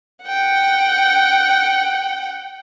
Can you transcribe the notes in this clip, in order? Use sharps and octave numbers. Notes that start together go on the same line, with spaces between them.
F#5 G5